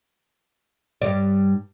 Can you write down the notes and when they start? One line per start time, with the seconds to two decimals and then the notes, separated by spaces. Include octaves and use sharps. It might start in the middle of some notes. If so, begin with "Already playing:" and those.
1.02 G2 D5